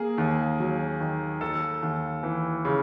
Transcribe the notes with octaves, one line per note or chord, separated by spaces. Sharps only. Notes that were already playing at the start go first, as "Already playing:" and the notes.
Already playing: A#3 G#4
D#2
F#3
D#3
D#2 A4
D#2
E3
C#3